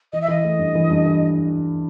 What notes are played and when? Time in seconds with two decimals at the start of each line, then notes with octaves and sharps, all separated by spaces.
0.13 E3 D#5
0.21 E5
0.28 E3 D#5
0.44 A3
0.59 G2
0.75 E3
0.90 G2
1.06 E3